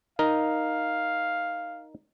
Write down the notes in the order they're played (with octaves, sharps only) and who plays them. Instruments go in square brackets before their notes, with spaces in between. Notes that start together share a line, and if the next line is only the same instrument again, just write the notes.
[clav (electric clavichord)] D#4 A#4 [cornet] F5